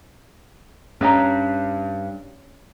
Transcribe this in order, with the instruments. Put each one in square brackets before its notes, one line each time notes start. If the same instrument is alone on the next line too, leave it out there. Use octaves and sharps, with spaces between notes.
[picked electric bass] G2 [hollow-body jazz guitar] C#4 D#5 A#5